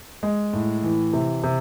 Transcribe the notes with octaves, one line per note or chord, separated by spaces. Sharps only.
G#3
A2
E3
C3
C3